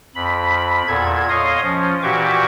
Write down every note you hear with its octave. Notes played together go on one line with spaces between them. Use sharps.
F2 B5
E2 A#2 A4 G#6
C#5 D#5 F5 C6 D#6
F3 C#4
A#2 E3 F#4 G4 C#6 D6